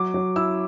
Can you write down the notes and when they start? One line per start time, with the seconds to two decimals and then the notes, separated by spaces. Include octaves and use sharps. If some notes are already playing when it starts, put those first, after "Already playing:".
Already playing: F#3 D6
0.14 F#3
0.36 E4 E6